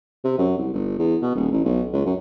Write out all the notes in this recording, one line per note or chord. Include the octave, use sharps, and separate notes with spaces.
C3
F#2
C2
G1
E2
B2
D#1
A1
B1
C#2
F#2